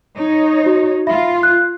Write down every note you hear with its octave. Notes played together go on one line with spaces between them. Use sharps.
D#4 C#5
F#4
F4 E5 B5 A#6
F#6